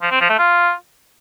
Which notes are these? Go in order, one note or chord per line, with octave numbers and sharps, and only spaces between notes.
F3
C4
F3
A3
F4